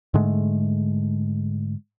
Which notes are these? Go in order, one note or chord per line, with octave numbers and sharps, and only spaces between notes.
G#2 D3 G#3 A3